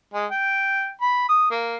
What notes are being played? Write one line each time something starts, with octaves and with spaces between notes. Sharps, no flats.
G#3
G5
B5
D#6
A#3